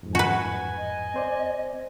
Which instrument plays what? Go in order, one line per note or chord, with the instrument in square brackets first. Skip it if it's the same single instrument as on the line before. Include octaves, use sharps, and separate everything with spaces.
[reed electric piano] F2 G#2
[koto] F#4 B4 [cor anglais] G#5
[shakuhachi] D#5
[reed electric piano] C4 C5 D5